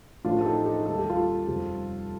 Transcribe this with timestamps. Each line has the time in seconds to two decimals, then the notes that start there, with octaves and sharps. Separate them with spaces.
0.25 A1 A2 F3 A3 D4 F4
0.41 A4
0.45 D#4 G4
0.65 D#4 G4
0.85 D#2 D#3 G3 A4
0.98 G4
1.10 F4 A4
1.47 F2 C3 G3